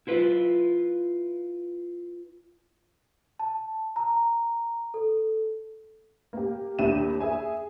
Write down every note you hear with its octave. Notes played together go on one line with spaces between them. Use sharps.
E4 F4 B4
A5
A#5
A4
A#3 G4
D#2 D4 E4 G4 D#7 E7
G#4 E5 G#5